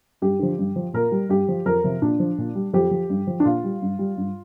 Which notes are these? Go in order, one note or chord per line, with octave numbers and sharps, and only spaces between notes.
G2 G4
D3 F3
G2
F3
A#2 A#4
G3
G2 G4
F3
F2 A#4
C3 F3
A#2 D4
F3
A#2
G3
F2 G4
F3
G2
F3
D4
A#2 F4
G3
G2
G3
G2